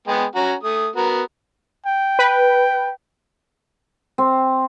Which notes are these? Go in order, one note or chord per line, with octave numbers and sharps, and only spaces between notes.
G#3 B3 G5
C#4 F#4 A#5
A3 D#6
B3 F#4 A#4
G5
B4
C4